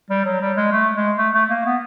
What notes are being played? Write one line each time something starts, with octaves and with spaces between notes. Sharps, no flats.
G3
F#3
G3
G#3
A3
G#3
A3
A3
A#3
B3